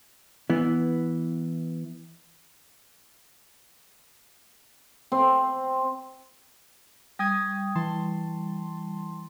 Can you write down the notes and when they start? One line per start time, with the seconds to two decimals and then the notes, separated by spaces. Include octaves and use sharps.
0.50 E3 B3
5.12 C4
7.19 G3 G5 D#6 G#6
7.75 E3 A5 C6